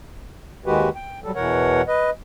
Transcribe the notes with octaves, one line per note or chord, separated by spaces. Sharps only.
D#2 D#3 G#3 F#4 G4 B4
G5
F#3 G3 A4
E2 B2 E3 A#4 C#5 F#5
B4 D#5